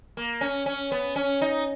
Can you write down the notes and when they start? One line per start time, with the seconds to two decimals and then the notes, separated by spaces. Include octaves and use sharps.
0.17 A#3
0.41 C#4
0.66 C#4
0.92 B3
1.16 C#4
1.42 D#4